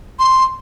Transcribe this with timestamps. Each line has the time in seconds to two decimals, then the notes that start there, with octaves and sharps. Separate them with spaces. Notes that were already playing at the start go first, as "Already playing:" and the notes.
0.19 C6